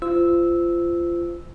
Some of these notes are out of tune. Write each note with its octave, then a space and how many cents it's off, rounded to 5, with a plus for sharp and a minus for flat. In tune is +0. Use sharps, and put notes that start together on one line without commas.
F4 -25 C5 -25 E6 -10